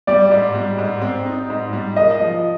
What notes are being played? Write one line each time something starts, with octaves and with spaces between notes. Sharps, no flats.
G3 D5
G#2
G3
G#2
C4
D#4
G#2
G3
A#3 D#5
F3